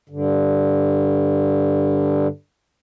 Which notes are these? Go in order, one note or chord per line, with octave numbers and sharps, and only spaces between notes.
G2 D3